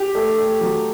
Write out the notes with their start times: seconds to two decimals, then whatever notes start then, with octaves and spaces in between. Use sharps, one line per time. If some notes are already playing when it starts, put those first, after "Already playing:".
Already playing: G4
0.15 A3
0.38 A3
0.61 F#3